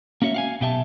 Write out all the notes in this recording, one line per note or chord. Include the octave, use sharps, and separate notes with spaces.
A#3 C#4 F#4 C#5 E5
F5 F#5 G#5
B1 B2 G4 E5 A5